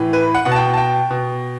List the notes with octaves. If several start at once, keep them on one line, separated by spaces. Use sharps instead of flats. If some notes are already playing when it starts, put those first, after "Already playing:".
Already playing: A2 E3
B4
F#5
B2 F#5
A5
G5
A5
G5
B2